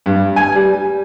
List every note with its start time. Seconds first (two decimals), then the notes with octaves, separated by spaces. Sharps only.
0.06 G2
0.36 G#5
0.55 G3